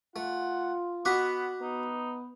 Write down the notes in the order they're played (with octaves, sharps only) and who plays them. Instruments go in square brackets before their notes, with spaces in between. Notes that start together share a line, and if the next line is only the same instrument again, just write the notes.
[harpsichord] A3 [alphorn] F4 [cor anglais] F#5
[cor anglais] B3 [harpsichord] F#4 D#5 C#6 [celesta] D6 F#6 B6
[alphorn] B3 [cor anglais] D#4